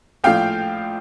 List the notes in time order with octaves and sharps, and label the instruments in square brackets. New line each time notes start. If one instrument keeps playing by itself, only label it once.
[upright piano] A#1 A2 F3 F5 G5